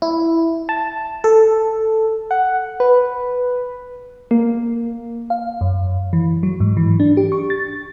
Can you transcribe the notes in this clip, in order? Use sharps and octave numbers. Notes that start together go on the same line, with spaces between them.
E4
A5
A4
F#5
B4
A#3
F5
F#2
E3
F#3
G#2
E3
D4
G4
C#6
A6